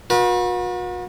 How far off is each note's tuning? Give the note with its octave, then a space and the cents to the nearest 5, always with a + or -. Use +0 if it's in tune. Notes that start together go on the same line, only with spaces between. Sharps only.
F#4 -40 B4 -40